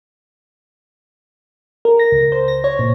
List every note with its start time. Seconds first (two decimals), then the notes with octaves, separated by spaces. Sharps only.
1.85 A#4
2.00 A#6
2.12 C#2
2.32 C5
2.48 A#6
2.64 C#5
2.79 A#2